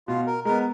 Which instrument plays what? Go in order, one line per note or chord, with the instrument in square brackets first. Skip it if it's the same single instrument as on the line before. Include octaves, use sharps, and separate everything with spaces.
[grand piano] B2 [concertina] F4
[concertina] A#4
[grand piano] G#3 B3 [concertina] A#4